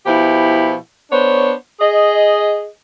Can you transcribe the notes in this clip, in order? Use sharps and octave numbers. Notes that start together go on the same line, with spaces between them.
B2 F3 E4 G4
B3 D4 C5 C#5
G#4 D#5